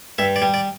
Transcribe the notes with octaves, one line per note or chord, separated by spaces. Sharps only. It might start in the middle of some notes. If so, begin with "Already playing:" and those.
G2 E5
D5
G3
D5